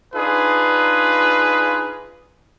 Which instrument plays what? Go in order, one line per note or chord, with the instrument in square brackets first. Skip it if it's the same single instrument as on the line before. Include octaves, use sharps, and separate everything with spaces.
[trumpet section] D4 D#4 F4 G#4 B4